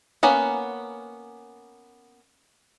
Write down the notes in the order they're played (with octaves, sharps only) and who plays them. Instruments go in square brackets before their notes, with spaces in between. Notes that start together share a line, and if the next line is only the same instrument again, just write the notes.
[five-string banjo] A#3 B3 C#4 F#5